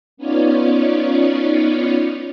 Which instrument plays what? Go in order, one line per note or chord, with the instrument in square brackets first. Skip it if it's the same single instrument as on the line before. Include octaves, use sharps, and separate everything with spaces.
[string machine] B3 C#4 D#4 F4 C#5 D5